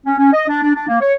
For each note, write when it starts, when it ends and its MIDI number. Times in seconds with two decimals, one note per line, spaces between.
0.06 0.15 61
0.18 0.30 61
0.33 0.46 75
0.48 0.61 62
0.62 0.74 62
0.74 0.85 62
0.88 0.99 58
1.02 1.14 73